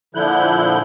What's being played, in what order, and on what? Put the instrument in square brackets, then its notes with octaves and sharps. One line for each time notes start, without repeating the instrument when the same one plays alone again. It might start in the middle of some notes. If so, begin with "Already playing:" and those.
[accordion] A#2 D3 F3 E4 F#6 G6